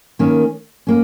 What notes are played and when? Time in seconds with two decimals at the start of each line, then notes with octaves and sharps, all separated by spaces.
0.19 D#3 A#3 C#4
0.87 A#3 C#4